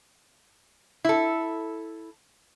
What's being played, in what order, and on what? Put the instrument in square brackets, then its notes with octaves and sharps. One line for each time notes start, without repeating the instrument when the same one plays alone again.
[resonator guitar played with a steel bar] E4 A4